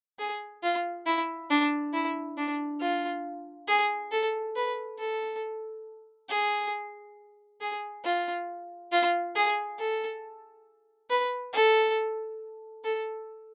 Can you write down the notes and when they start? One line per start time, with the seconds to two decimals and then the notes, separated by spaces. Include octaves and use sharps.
0.19 G#4
0.63 F4
1.06 E4
1.50 D4
1.93 E4
2.37 D4
2.81 F4
3.68 G#4
4.11 A4
4.56 B4
4.98 A4
6.29 G#4
7.61 G#4
8.04 F4
8.92 F4
9.35 G#4
9.79 A4
11.10 B4
11.53 A4
12.84 A4